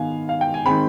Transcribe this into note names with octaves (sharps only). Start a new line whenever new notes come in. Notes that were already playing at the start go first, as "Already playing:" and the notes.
Already playing: D#3 B3 F5 G#5
F5
G5
G#5
D#3 G#3 C4 G5 B5